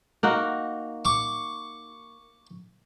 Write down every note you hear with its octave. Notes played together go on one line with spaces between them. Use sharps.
A#3 D#4 F#4
C#6 D6